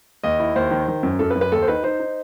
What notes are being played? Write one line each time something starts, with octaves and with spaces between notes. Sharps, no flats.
D#2 D#5
E4
D#2 C5
D#3
D#3
F#2
F#2 A4
B4
F#2
B4
D#2 A4
C5
D#4 B4
D#4 C5
D#4